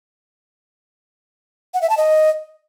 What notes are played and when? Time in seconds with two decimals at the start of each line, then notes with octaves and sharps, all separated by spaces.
1.74 F#5
1.82 E5
1.90 A5
1.97 D#5